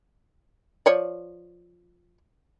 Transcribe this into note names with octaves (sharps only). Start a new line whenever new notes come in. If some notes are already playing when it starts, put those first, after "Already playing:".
F3 C#5 D5